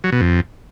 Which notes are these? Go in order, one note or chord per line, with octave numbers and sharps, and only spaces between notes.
F#3
B2
F2